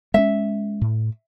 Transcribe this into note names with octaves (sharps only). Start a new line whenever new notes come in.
G#3 A3 C#4 E5
A2